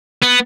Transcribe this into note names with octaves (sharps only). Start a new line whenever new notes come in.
B3